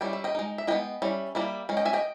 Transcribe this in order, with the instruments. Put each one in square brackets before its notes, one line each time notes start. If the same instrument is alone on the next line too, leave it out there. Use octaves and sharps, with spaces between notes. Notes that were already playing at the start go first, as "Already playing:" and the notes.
[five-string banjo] G3 C#4 E4 G5
E5
D#5 G5
G#3 D#4
E5
G#3 B3 E4 D#5 G5
G3 C#4 E4
G3 A#3 E4
G#3 C#4
D#5 G5
E5 G#5
D#5 G5